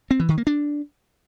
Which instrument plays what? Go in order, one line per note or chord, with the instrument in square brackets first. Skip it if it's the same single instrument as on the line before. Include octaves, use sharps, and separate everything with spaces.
[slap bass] C4
E3
D#3
A#3
D4